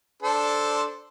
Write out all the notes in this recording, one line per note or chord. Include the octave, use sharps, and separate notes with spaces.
D4 A4 C5